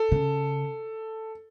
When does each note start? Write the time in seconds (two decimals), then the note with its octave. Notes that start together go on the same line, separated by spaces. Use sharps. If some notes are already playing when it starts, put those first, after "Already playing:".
Already playing: A4
0.12 C#3